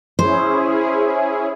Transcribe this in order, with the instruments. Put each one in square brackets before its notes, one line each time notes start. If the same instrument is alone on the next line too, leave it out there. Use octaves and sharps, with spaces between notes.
[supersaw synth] C#4 E4 G#4 [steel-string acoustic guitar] C5